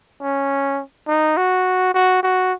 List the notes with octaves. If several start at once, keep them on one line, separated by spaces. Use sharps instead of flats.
C#4
D#4
F#4
F#4
F#4